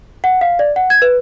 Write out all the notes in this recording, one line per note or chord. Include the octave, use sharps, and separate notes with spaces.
F#5
F5
D5
F#5
G#6
B4